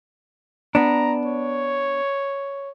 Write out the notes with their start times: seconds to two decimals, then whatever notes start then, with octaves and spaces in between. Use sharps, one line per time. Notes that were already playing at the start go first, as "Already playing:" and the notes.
0.75 B3 D4 A#5
1.25 C#5